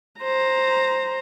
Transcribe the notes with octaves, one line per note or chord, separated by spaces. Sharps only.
C5 A#5